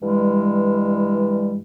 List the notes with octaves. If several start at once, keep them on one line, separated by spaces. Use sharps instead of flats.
G2 E3 G3 G#3